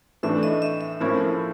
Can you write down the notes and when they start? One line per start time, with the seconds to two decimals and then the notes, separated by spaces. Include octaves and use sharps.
0.23 A2 E3 A3 D4 E5
0.43 D#5
0.62 E5
0.81 E5
1.00 A2 F3 A#3 C#4 E4